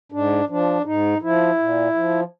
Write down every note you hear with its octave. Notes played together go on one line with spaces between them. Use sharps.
G#2 D4
F3 D4
G#2 D#4
F3 E4
A#2
F3